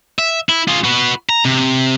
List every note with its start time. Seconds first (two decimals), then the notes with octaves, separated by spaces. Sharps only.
0.19 E5
0.49 E4
0.68 F4 G#4
0.84 F#4 B4
1.29 A#5
1.45 C3